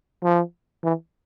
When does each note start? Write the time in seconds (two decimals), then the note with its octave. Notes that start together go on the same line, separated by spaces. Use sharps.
0.23 F3
0.84 E3